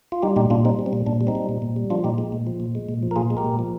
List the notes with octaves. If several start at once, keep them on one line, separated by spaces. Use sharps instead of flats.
F4
G3 D#4 G4
A#2 D#4 G4
A#2 D4 F4
G3 C4 D#4
G3
C4
A#2
A#2 D4
G3
C4 D#4
G3
A#2
A#2
G3
F3 D4 F4
A#2 D#4 G4
G#3
A#2
F3
A#2
G#3
A#2
F3
A#4
A#2 F4 G#4
G#3
G4 A#4
A#2
F3